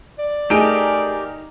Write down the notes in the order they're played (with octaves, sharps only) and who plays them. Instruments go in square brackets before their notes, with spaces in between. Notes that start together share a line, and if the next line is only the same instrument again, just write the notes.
[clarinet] D5
[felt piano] A3 G#4 D7 [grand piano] D#4 [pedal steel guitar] G4 A#4